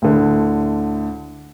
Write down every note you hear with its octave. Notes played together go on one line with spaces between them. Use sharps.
D2 A2 D3 A3